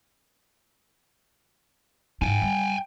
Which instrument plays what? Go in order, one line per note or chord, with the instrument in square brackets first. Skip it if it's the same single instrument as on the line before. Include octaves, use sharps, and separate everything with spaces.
[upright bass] G#2 E4 [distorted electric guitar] G5 G#5
[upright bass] G3